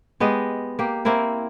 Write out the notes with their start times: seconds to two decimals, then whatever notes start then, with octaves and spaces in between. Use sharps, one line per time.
0.20 G#3 B3 G4 D#5
0.79 A#3 G4
1.05 A#3 C4 E4 A#4